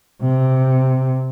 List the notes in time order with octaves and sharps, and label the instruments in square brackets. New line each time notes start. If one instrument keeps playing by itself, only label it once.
[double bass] C3